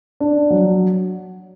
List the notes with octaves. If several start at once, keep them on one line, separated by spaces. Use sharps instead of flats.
D4
F#3